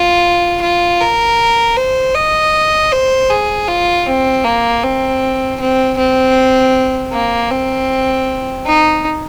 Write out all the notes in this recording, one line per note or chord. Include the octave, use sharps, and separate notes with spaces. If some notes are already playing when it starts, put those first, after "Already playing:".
Already playing: F4
F4
A#4
C5
D#5
C5
G#4
F4
C4
A#3
C4
C4
C4
A#3
C4
D#4